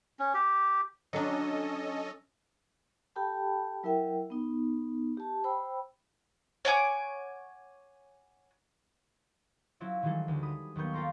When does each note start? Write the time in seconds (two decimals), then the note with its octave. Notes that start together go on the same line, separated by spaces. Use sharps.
0.19 C#4
0.34 G4
1.13 F#3 C#4 D4 A4 D#5
3.16 G4 A4 G5 A5 B5
3.84 F#3 E4 A#4 E5 G5
4.30 B3 D#4
5.17 G4 A5
5.44 C5 G5 B5 E6
6.65 C#5 F#5 G#5 D6
9.80 F#3 C4 C#4 E4 F4
10.03 D#3 E3 F#3 G3 G#4 A4
10.28 D2
10.43 B5 D#6
10.76 D#2 F#3 A#3 B3 C#6 G6
10.93 F4 G4 A4 A#4 C6 F6